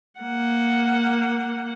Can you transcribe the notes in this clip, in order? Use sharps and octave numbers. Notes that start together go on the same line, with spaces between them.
A#3 F#5